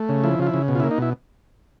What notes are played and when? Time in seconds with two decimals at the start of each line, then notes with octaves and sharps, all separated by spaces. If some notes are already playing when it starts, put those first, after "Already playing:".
Already playing: A3
0.09 C#3
0.24 F3 E4
0.39 C#3 F4
0.47 E4
0.54 C#3
0.68 B2
0.75 F4
0.80 E4
0.84 A#3
0.91 D#4
0.98 B2 E4